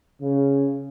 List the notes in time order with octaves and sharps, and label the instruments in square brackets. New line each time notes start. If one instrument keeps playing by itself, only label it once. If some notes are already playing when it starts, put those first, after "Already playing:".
[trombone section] C#3